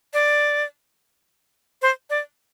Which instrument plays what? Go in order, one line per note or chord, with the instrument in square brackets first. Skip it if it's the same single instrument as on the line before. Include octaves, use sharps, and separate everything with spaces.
[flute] D5
C5
D5